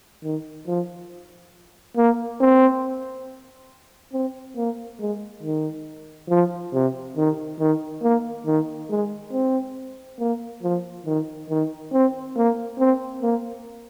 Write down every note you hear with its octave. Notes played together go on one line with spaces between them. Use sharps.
D#3
F3
A#3
C4
C4
A#3
G#3
D#3
F3
C3
D#3
D#3
A#3
D#3
G#3
C4
A#3
F3
D#3
D#3
C4
A#3
C4
A#3